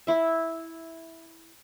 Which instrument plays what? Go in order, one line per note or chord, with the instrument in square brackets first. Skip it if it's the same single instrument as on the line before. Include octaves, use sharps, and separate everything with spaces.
[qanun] E4 E5